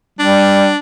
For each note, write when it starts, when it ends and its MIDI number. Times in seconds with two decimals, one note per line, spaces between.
0.19 0.70 55
0.19 0.77 62